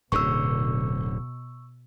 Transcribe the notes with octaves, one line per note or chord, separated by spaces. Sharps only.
D1 F#2 B2 D3 C#6 E6